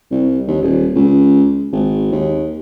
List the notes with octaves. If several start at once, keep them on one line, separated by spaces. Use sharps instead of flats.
C2
D#2
D#1
C#2
G#1
D#2